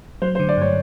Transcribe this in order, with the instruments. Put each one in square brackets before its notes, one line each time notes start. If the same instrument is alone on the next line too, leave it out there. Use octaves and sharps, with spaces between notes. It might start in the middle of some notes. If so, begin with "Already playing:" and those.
[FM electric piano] F#3 [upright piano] C5
[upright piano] C5
[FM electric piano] D3
[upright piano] D5
[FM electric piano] G2 [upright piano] C#5